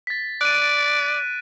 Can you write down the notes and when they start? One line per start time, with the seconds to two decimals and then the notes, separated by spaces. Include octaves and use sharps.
0.07 A6 B6
0.41 D5 F#6 D7 D#7